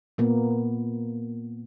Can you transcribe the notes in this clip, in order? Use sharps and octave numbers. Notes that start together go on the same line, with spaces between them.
A#2 A#3 B3